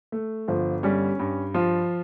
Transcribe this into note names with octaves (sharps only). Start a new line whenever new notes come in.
A3
G1 F3
G3 C#4
G2
F3 F4